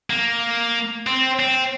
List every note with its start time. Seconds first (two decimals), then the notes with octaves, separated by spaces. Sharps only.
0.10 A#3
1.07 C4
1.40 C4